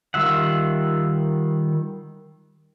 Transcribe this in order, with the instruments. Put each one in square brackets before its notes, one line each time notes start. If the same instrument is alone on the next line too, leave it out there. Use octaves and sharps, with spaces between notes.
[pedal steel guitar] D#3 G3 F4 E5 F#5